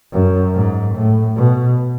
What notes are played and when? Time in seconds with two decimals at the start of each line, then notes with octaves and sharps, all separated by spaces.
0.13 F#2
0.55 G#2
0.95 A2
1.36 B2